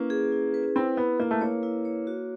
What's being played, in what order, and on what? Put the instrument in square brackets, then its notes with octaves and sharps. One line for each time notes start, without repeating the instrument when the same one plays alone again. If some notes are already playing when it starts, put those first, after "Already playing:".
Already playing: [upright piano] A#3 [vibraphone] C#4 E4 B4
[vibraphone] G#4
E4
B4
[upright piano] C4 [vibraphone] E4
[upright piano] B3 [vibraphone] E4
[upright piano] A#3 [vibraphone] E4
[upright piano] A3
[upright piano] A#3 [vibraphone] C#5
[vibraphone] E4
C#5
F#4